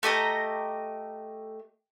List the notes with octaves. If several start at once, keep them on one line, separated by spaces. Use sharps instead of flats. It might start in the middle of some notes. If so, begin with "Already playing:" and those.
A3 G4 D#5 A#5